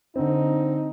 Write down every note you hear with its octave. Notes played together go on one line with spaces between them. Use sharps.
D3 C4 D#4